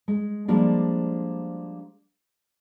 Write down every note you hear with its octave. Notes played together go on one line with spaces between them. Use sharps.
G#3
F3 G3 G#3 A#3 D4